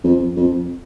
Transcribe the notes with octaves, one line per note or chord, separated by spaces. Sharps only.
F2
F2